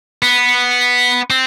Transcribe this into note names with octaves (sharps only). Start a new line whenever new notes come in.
B3
C4